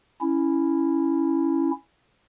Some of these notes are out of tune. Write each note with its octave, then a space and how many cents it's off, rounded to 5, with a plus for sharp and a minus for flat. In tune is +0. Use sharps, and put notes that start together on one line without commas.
C#4 +0 E4 +0